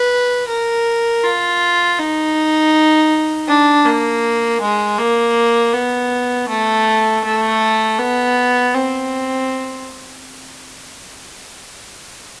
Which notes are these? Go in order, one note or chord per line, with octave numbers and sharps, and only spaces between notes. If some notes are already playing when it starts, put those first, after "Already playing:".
Already playing: B4
A#4
F4
D#4
D4
A#3
G#3
A#3
B3
A3
A3
B3
C4